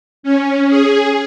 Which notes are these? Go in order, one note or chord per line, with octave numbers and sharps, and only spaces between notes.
C#4
G#4